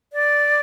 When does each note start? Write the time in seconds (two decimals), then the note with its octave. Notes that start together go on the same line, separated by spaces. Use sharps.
0.13 D5